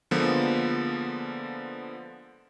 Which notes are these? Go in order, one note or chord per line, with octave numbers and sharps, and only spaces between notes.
D3 F3 G#3 A#3 B3 F4